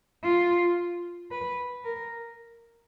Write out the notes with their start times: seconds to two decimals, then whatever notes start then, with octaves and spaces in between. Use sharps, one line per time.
0.24 F4
1.31 B4
1.84 A#4